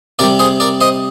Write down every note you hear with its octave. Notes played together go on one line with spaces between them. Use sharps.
C3 G3 A#4 D5
G#4 C5
A#4 D5
C5 D#5